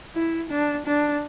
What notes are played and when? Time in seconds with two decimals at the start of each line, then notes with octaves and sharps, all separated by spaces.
0.14 E4
0.50 D4
0.86 D4